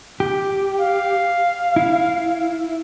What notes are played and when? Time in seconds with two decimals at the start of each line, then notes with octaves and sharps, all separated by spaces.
0.20 G4
0.80 F5
1.76 E4